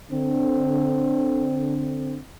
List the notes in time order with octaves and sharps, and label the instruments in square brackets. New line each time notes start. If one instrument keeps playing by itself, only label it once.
[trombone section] D3 C4